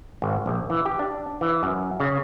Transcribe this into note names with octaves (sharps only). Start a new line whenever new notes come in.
G#1
A#1
E3
G4
D4
E3
F#2
C#3